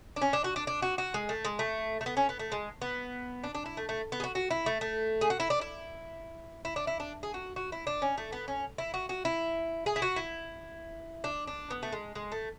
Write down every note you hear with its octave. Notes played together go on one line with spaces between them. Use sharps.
D4
C#4
D4
F#4
D4
D4
F#4
F#4
G#3
A3
G#3
A3
A3
B3
C#4
B3
A3
G#3
B3
D4
D4
E4
A3
A3
B3
G#4
F#4
F#4
E4
A3
A3
G#4
F#4
E4
D4
E4
E4
D4
E4
D4
G#4
F#4
F#4
E4
D4
C#4
A3
B3
C#4
E4
F#4
F#4
E4
G#4
E4
F#4
E4
D4
D4
B3
A3
G#3
G#3
A3